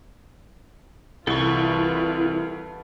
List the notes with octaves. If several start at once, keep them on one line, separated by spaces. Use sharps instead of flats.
C2 E3 E4 F4 A4 B4 C#6